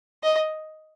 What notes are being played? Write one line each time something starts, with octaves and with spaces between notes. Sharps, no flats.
D#5